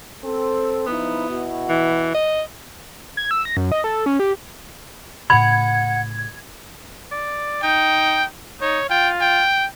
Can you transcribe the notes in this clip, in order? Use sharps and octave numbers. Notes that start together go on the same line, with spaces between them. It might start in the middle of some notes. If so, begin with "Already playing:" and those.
C4 A4
F3 B3 D#4 E4
B2 E4 F#4
E3
D#5
G#6
E6
A#6
F#2
D#5
A4
C#4
G4
A2 C#3 F#5 B5 G#6
D5
D#4 G5
D#4 C#5
F4 G5
G5